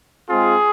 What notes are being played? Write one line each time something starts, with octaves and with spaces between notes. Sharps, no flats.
G#3 C4 F4 G#4